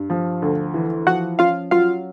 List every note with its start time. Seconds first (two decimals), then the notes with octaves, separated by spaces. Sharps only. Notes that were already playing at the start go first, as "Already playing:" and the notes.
Already playing: G2
0.10 F3
0.42 D2
0.74 E3
1.07 F3 F#4 F#5
1.39 C#4 F4 F5
1.71 F#3 F4 F5